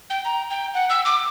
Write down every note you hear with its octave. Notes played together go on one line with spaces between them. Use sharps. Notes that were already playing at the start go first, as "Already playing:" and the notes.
G5
A#5
G5
F#5
E6
D6